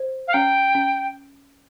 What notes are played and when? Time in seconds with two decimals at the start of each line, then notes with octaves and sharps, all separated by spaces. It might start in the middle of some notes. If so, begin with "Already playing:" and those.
Already playing: C5
0.27 F5
0.33 C#4 G5
0.75 C#4